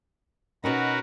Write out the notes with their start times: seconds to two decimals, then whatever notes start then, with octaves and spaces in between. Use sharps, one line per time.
0.64 B2 C#4 D#4 F#4 A#4 B4